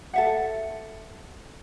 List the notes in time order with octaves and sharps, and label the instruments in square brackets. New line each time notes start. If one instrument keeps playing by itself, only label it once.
[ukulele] A4 E5 F#5